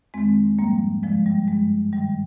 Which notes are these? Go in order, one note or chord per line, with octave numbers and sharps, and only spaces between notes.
F2 D#3 G#3 C4
G#2 F3 G3 A#3
G2 D3 F3 G#3
G3
G2 F3 G#3
G#2 D#3 G3